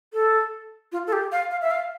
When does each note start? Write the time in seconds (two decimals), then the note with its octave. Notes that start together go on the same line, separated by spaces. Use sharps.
0.13 A4
0.92 F4
1.07 A4
1.13 G4
1.32 F5
1.51 F5
1.62 E5
1.71 F5